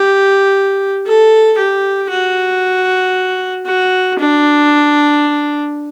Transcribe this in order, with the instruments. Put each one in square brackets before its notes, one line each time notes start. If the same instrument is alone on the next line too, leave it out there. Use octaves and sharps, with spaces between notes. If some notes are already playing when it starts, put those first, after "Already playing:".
Already playing: [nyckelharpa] G4
A4
G4
F#4
F#4
D4